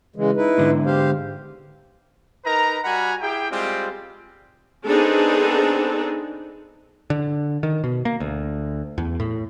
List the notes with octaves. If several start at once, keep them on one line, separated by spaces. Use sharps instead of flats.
C#3 E3 G#3
D#4 E4 B4
G#2 D3
G4 C5 F5
D#4 A#4 B4 A#5
G3 F#4 F#5 G#5 A#5 B5
E4 G4 G#4 G5
G3 G#3 C4 F4 G4 G5
B3 C4 D4 D#4 G#4 A4
D3
D#3
B2
A#3
D2
E2
A2